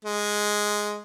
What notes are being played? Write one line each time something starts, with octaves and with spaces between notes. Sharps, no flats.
G#3